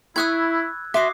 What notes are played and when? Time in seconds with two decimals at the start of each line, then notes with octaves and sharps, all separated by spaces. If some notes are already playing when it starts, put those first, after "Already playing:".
0.16 E4 B5 C#6 D#6 E6 F#6 G#6
0.94 F#4 E5 C6 D6 D#6 C7